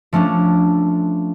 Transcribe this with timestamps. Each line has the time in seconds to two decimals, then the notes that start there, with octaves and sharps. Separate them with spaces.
0.13 F3 A3 C#4 D4